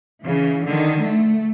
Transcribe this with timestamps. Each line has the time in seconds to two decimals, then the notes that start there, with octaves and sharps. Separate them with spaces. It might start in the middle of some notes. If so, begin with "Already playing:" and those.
0.24 C#3 E3
0.64 D3 D#3
1.02 A3